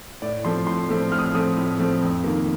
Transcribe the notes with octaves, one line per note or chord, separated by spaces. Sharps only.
A2 D5
F3 A3 C4 C6
A2 C6
F3 A3 C4
A2 F6
D#6
F6
F3 A3 C4 D#6
A2
F3 A3 C4
F2
D#3 A#3